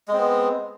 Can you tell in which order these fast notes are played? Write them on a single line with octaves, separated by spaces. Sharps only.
G#3 C4 B3